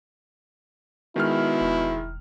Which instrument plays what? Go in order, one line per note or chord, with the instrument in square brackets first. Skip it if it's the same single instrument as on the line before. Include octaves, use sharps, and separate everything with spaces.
[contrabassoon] B2 [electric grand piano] D#3 G#3 F6 [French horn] E4
[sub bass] E1